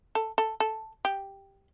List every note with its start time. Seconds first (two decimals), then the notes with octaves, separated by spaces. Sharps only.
0.15 A4
0.38 A4
0.60 A4
1.05 G4